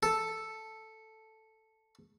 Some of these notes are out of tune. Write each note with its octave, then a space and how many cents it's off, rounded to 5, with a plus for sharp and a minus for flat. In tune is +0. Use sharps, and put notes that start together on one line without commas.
A4 +0